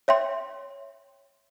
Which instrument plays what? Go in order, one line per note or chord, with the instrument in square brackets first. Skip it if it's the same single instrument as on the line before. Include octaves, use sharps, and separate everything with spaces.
[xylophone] C#5 E5 G5 C6